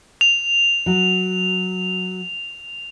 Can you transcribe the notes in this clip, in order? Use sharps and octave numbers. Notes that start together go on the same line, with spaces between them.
F7
F#3